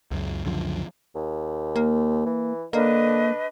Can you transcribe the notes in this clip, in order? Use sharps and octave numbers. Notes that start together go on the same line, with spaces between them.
C#2 F#2
C#2 F#2 D3 F3
D#2
A#3
E3
D3 A#3 D4 B4 D#5